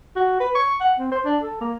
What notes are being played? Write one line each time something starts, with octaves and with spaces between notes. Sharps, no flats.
F#4
B4
C#6
F#5
C4
C5
D4
A4
A#3